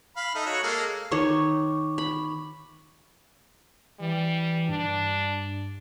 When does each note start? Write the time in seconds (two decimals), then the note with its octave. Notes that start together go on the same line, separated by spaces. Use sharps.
0.17 F5 B5
0.35 D#4 A4 E5
0.46 F#4 C#5
0.63 G#3 A#3 A4
1.11 D#3 D#4 C#5 C#6 D6
1.98 B5
4.00 E3 G3
4.69 G2 D4